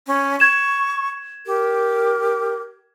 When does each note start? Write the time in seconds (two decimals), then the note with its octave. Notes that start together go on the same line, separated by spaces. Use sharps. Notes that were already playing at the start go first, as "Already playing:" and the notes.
0.07 C#4
0.40 C#6 G#6 E7
1.46 G4 A#4